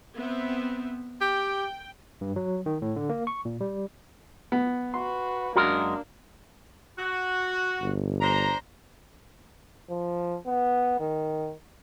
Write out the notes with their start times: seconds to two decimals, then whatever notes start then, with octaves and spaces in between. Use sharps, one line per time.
0.17 B3 C4 E5
1.21 G4 G5
2.21 G2
2.36 F#3
2.66 D#3
2.82 A2
2.96 D3
3.09 A#3
3.27 C#6
3.45 A#2
3.61 G3
4.52 B3
4.94 F#4 B4 C6
5.56 F#2 G#3 A#3 D4 F#4 A#4
6.99 F#4
7.82 G1
8.21 D4 C5 A#5
9.90 F3
10.46 B3
11.00 D#3